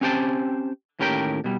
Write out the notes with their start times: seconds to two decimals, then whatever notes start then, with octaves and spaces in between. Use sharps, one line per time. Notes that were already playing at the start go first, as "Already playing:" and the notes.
0.01 C4 C#4 G4 C5 G5 A5
0.99 D#2 A2 C#4 G4 A#4 G5
1.44 B2 G3